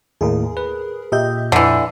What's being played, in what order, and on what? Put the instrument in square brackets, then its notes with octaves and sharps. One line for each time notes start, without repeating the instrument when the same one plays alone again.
[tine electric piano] D#2 A2 [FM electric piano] G#4 A#4
[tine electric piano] B4
[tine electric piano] A#2 G6 [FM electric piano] G4 D#5 E5
[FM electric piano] F2 [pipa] D3 E3